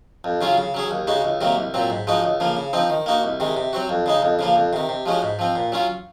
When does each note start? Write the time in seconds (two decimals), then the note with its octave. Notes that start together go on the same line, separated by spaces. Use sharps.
0.24 F2
0.41 C#3 F#3 C#4 F4
0.58 C#3
0.74 F#3 C#4 G#4
0.91 D#2
1.07 C#3 G#3 D#4 F#4
1.25 C#2
1.41 C3 D#3 F#3 A#3
1.57 C2
1.74 A#2 F#3 C4
1.90 G#2
2.07 F3 G#3 D#4 F#4
2.24 C#2
2.40 C#3 F3 A#3
2.57 C#3
2.73 F3 C4 D#4
2.90 D#3
3.06 A#3 D#4 F#4
3.24 C2
3.40 C3 D#3 G#3
3.57 C3
3.73 F#3 C4 F#4
3.89 F2
4.06 C#3 G#3 D#4
4.22 F2
4.39 C#3 F3 A#3
4.56 F2
4.73 C3 D#3
4.89 C3
5.06 F3 G#3 C#4 F#4
5.22 G#2
5.39 F3 C4
5.55 A#2
5.72 F#3 C#4 F4